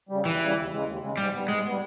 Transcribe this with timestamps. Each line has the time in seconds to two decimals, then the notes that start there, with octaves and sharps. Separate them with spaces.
0.09 C#3 G3
0.25 D#2 E3
0.40 C#3 G3
0.56 D#2
0.72 C#3 G#3
0.87 D#2
1.03 C#3 G#3
1.17 G#2 G3
1.34 G3 B3
1.48 G#2 G#3
1.64 G3 B3